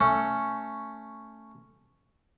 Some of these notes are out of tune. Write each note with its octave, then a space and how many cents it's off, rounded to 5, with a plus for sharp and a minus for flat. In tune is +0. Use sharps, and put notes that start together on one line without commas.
A3 +10 C#4 +0